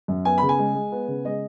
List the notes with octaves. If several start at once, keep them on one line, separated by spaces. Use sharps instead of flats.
F#2
B3 G#5
C#3 B5
G#5
G#3
G#3
B3
C#3
G#3 D#5